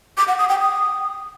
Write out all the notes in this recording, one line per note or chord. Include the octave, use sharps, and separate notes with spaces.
D6
F#5
D#6
G5
D#6